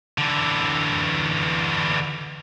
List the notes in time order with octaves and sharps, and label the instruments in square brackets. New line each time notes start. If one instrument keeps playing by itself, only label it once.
[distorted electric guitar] D3 E3